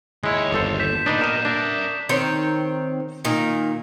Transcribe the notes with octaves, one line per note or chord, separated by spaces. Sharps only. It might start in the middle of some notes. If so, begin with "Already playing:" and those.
D#2 G#3 E4 C#5
G1 A4 C5
G6 B6 E7
A#2 B3 D4 D#4 B4 D#6
A#4 D#5 E7
D4 A#4 E5
D#3 C4 C#5
A#2 D#3